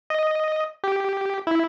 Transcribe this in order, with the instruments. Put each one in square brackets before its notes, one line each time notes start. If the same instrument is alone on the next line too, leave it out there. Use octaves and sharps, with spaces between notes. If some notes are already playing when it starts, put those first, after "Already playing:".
[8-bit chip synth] D#5
G4
E4